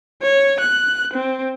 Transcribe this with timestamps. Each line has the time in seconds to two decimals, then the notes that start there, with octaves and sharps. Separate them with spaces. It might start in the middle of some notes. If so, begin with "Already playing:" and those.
0.22 C#5
0.60 F#6
1.14 C4